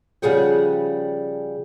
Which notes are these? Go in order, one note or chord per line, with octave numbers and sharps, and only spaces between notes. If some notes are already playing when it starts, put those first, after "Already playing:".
C#3 F3 G3 G#4 F#5 G5